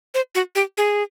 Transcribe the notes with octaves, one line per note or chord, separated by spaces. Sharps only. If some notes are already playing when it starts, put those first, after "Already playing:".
C5
F#4
G4
G#4